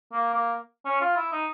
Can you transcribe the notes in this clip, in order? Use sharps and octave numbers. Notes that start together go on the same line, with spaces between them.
A#3
A#3
C#4
F4
E4
D#4